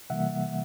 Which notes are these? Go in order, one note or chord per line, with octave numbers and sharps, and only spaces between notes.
C3 E3 G3 A#3 E5 F#5